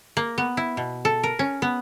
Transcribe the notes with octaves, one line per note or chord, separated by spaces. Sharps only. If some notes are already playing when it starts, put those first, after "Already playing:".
A#3
B3
E4
B2
A4
A#4
C#4
B3